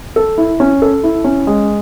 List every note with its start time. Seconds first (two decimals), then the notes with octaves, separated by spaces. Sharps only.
0.16 A4
0.38 E4
0.60 C#4
0.82 A4
1.03 E4
1.24 C#4
1.47 G#3